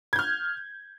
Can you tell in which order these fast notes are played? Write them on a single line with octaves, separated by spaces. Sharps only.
G#6 G6 F6